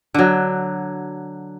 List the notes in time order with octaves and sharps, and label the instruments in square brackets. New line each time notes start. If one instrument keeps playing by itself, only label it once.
[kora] D3 F#3